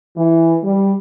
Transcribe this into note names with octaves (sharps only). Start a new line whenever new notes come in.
E3
G3